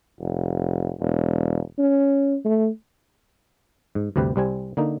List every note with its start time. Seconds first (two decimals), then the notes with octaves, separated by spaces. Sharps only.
0.20 F1
1.00 E1
1.78 C#4
2.45 A3
3.95 G#2
4.16 D2 G2 C3 G4 B4
4.36 C2 G3 C4 G#5
4.77 D3 A#3 D#4